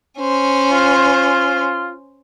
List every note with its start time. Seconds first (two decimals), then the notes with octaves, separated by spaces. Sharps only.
0.18 C#4 C5
0.71 F4